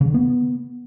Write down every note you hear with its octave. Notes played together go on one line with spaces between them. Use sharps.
C#3
D3
B3